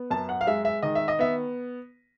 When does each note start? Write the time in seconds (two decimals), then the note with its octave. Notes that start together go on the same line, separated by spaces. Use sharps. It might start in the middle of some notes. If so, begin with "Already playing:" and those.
Already playing: B3
0.11 F#2 A5
0.29 F#5
0.41 F5
0.47 G#3 E5
0.65 E5
0.83 D#3 D#5
0.95 E5
1.08 D#5
1.19 B3 E5